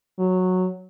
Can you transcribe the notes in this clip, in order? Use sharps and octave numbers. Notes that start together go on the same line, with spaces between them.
F#3